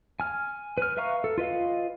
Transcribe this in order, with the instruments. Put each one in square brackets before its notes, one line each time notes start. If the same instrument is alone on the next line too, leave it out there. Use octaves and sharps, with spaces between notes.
[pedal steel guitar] G#5 F6
B4 F6
B4 E5 F5 A#5 C#6
A4
F4 B4 D#5 F5